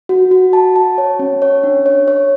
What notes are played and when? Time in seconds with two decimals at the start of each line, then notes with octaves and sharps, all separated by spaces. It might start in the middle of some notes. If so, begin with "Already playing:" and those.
0.09 F#4
0.31 F#4
0.53 A5
0.76 A5
0.98 C#5
1.19 C#4
1.42 C#5
1.63 D4
1.86 C#5
2.08 C#5